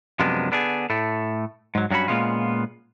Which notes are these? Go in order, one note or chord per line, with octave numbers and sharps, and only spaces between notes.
F#2 C3 F3 G#3 B3 D4
D3 B3 D4 E4 G#4
A2 A3
G#2 F#3
G2 F#3 C#4 F#4 B5
A#2 F3 G#3 B3 C#4 F4